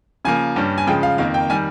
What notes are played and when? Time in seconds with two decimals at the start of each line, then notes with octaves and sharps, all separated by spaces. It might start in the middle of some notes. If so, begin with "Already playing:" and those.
0.25 C#3 F3 A#3 G#5
0.56 G2 G3 C#4
0.78 G#5
0.87 C#3 F3 G#3 G5
1.03 F5
1.18 F2 D#3 A#3 F5
1.34 G5
1.50 D#3 G3 G#5